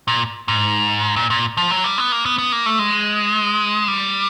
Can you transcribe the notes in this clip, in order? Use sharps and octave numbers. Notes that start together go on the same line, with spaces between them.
A#2
G#2
A#2
A#2
F3
F#3
G3
B3
A#3
B3
B3
A#3
A3
G#3
G3